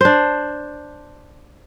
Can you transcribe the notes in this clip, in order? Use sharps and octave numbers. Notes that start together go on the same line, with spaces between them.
D4 C5